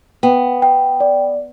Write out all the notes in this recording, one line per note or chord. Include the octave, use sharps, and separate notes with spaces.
B3 G5
G5
D5